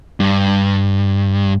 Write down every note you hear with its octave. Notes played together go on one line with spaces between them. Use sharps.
G2